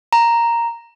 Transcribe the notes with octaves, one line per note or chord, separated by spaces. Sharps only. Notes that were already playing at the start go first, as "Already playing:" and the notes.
A#5